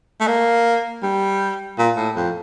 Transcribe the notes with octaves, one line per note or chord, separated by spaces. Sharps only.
A3
A#3
G3
A#2
A2
F2